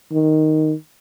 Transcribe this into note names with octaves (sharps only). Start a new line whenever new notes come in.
D#3